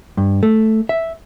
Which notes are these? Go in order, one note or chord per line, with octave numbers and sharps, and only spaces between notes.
G2
A3
E5